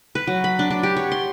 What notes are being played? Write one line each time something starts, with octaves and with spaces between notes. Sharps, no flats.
B4
F#3
B5
D4
D4
G4
C#5
C6